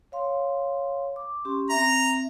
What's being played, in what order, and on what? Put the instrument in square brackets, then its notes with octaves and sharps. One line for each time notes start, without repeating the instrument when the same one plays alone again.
[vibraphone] C#5 F5 C6
D6
C#4 G4 C6
[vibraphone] C4 E5 [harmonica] A#5